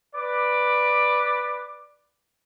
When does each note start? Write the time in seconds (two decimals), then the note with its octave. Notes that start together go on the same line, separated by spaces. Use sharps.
0.14 B4 D5 D6